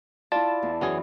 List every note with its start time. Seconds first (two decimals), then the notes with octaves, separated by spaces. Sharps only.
0.32 E4 F4 D5 A5
0.63 E2
0.81 F#2 E3 B3 C#4 G#4